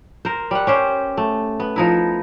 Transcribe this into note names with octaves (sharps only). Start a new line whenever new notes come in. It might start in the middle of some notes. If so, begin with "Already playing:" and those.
A#4 C5
G3 F#5
C#4 G4 C5
A3
B3
F3 D#4 E4